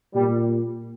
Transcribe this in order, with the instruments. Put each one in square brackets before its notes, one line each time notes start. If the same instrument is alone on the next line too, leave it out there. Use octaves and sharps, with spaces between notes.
[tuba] A#2 [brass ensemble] G3